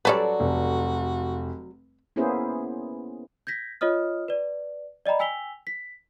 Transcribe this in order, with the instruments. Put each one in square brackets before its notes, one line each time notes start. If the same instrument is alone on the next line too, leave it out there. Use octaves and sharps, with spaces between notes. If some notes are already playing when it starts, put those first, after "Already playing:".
[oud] F#3 A4 D5 [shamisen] G3 C#4 B4 [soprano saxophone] F#4
[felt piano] F1
[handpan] A#3 B3 C#4 E4 G#4 C5
[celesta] G6 G#6 A#6 B6
F4 C#5 D#5 D#6 F6
B4 D5
D5 D#5 G5 A#5 B5
G5 G#5 E6 B6 F7 G7
B6